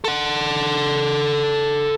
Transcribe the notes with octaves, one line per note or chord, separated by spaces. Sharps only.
A4 F#5